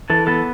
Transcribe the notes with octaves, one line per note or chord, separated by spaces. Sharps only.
E3 A4
B3 A4